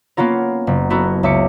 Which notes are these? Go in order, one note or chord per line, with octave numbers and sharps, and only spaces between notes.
A#3 B3 C#4 F4 A#4
F#1
B3 E4 F#4 A4 A#4
C#2 E5 D6 C#7